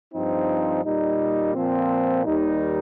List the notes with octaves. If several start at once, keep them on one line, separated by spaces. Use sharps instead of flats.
G2 F3 C4 D#4
A#2 G3 D#4
A#2 F3 C4
D#2 D#3 G3 D#4